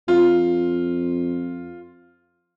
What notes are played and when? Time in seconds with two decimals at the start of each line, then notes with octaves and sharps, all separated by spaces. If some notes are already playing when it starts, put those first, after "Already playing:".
0.08 F2 F4